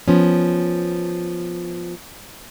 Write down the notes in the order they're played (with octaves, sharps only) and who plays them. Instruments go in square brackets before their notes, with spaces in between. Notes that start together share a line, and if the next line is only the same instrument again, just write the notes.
[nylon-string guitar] F3 B3 C#4